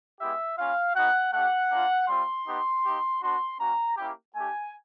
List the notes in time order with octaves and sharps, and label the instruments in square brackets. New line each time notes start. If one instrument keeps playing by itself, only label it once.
[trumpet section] G#3 B3 E4 G4 E5
A#3 C#4 F4 F5
B3 D#4 F#4 F#5
A3 D4 G4 F#5
A#3 D4 F4
G3 C4 F4 C6
B3 D#4 G4
A#3 D#4 G4
B3 D4 F#4 C6
A#3 C#4 F#4 A#5
A#3 C#4 E4 G4
A3 D4 G4 G#5